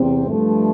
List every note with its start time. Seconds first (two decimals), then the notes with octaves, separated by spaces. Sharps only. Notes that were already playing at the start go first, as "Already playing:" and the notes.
Already playing: E2 C3 C4
0.28 G2 F3 A3